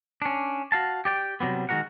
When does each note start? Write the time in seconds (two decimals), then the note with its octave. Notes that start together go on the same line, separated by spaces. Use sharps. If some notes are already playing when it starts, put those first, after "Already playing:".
0.22 C#4 D4
0.72 F#4 F5 A5
1.05 G4 D5 G5
1.40 C3 F#3 G3 B3
1.69 D#3 G#3 F#4 A#4 F#5